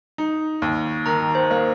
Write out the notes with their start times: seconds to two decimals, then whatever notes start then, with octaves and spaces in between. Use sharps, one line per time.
0.18 D#4
0.62 D#2
1.06 D#3 A#5
1.35 C5
1.51 A#3